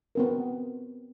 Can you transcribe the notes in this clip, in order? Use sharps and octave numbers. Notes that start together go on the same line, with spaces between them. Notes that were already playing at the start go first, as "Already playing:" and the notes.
B3 C4 A#4